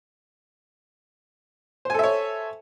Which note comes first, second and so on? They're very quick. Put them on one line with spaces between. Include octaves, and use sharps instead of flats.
C5 G#5 A4 E5 C#5